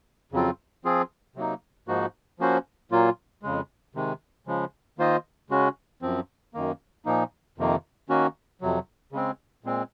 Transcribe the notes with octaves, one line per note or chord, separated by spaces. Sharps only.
F2 C#3 F#3 C4 F4
F3 C4 F4 G#4
C3 F#3 A#3 D#4
G#2 F3 A#3 D#4 F#4
F3 A#3 C#4 F#4 C5
A#2 F#3 A#3 F4
F2 C#3 G#3
C3 D#3 G#3
C#3 F3 G#3
D#3 A#3 F4 C5 D#5
C#3 G#3 C#4 F#4
F#2 F3 C4
F#2 D#3 A#3
A#2 F3 A#3 D#4
F2 C3 D#3 A#3
D#3 A#3 C#4 F#4
F2 C3 F#3
C#3 G#3 C4
A#2 G#3 C4